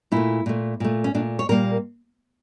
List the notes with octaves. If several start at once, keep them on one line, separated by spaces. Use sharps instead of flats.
A#2 A3 E4
A#2 A3
A#2 A3
C#4
A#2 A3 D4
C#5
A#2 G3 A#3 A#4